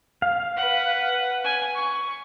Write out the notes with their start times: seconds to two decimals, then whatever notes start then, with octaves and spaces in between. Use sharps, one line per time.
0.22 F5
0.57 B4 F#5
1.44 G#5
1.75 C#6